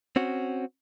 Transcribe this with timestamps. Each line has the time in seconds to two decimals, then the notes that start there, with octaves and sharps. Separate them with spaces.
0.16 C4 C#4 F#4